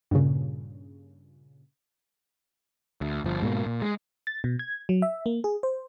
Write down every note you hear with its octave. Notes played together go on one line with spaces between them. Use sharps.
G2 A#2 C#3
D2
G1 F3
G#2 B2 A#3
A#2
G#3
A6
B2
G#6
F#3
E5
A#3
G#4
C5